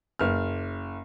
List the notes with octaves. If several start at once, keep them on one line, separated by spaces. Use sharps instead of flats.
F#1 F6